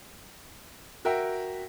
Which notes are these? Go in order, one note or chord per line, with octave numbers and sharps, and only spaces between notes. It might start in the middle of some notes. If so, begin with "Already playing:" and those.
F#4 A#4 E5 G5